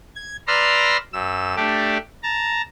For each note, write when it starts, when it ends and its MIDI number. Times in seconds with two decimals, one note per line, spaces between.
0.16 0.37 92
0.47 0.97 71
0.47 0.97 74
0.47 0.97 82
0.47 0.97 84
0.47 0.97 88
0.47 0.97 89
1.13 1.55 42
1.13 1.55 88
1.57 1.98 57
1.57 1.98 62
1.57 1.98 67
2.23 2.62 81
2.23 2.62 82